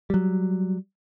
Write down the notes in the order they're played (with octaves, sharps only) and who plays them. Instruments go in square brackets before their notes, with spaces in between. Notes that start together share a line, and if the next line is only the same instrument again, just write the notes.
[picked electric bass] F#3 G3